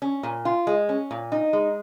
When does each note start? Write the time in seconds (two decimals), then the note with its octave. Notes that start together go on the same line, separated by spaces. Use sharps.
0.02 C#4
0.23 A#2
0.45 F4
0.67 G#3
0.89 C#4
1.11 A#2
1.32 D#4
1.53 G#3